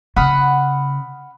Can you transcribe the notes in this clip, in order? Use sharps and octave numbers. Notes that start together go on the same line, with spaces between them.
C#3 F#5 B5 D#6 F6